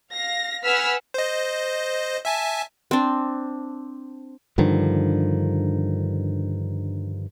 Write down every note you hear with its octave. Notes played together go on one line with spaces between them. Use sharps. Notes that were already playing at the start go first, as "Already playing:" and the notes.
F5 A#6
B4 F#5 G#5 E6 F6 B6
C5 D#5
E5 G#5 A5
C4 D4
G2 D3 D#3 F3